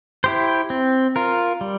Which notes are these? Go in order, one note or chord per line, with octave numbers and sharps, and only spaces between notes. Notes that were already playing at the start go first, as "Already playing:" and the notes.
E4 G4 C5
C4
F4 A#4
G3